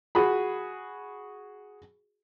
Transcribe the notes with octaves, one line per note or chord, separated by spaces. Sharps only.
F#4 G#4 B5